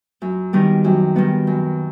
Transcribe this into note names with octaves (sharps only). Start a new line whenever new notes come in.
F#2
D#3 G3 B3
F#2
D#3 G3 B3
F#2